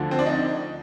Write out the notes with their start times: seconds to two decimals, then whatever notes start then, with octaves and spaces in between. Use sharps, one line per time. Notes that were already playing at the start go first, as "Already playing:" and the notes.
Already playing: D2 D3 F3
0.11 C4
0.19 D4
0.26 D#4